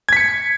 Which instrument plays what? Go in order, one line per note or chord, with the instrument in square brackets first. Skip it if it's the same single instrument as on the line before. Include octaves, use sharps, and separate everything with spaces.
[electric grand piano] G#6
B6
C#7